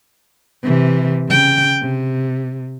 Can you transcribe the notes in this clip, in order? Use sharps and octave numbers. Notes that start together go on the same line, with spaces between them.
C3 E3
C#3 G5
C3